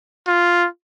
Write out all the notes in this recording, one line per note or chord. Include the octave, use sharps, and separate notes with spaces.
F4